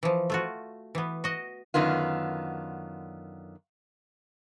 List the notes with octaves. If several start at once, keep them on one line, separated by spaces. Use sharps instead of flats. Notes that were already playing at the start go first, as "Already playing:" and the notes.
E3 F3
A3 F4 F#4
E3 B3
F#4 D#5
F#2 D3 D#3 B3 F4